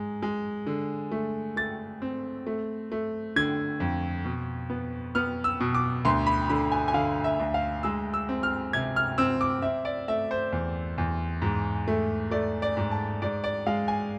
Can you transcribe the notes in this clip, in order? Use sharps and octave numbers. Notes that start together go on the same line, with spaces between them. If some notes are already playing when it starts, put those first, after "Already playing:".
Already playing: G#2 G#3
G#3
D3
A3
A3 A6
C4
A3
A3
D3 G#6
F2
B2
B3
B3 F6
E6
B2
D6
D2 C6
B5
D3 B5
G#5
G#5
D3 F5
E5
D2
F5
G#3 E6
E6
C4
F6
C3 G#6
F6
C4 E6
D6
C4 E5
D5
A3 E5
C5
E2
E2
G#2
A3
A3 D5
D5
G#2
A5
G#2 D5
D5
G#3 F5
G#5